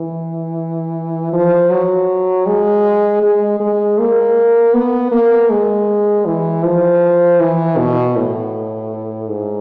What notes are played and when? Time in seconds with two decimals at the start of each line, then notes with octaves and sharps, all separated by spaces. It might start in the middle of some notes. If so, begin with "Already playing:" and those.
Already playing: E3
1.33 F3
1.70 F#3
2.46 G#3
3.23 G#3
3.60 G#3
3.99 A#3
4.74 B3
5.12 A#3
5.50 G#3
6.26 E3
6.64 F3
7.40 E3
7.77 B2
8.16 A2
9.29 G#2